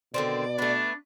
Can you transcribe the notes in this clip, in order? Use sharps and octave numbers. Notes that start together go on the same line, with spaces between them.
B2 D3 D#3 C4 D5
A3 B3 D4